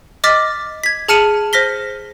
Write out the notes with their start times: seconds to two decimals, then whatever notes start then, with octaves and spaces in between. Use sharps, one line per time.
0.24 D#5 D6 F6 A6 B6
0.84 G#6 B6
1.08 G#4 A5 F6 C#7 D#7 F#7
1.53 C5 F6 A#6 B6 G7